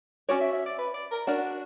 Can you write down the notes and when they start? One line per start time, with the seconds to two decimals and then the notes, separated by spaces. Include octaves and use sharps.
0.29 C#4 F#4 C#5 D5
0.41 E5
0.53 E5
0.66 D5
0.78 B4
0.94 D5
1.11 A#4
1.27 D4 F#4 A#4 D5